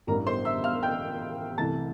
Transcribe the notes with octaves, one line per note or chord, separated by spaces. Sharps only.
A1 G2 E3 A#4 A#5
C5 C6
E5 E6
F5 F6
G5 G6
C2 C3 E3 A3 A5 A6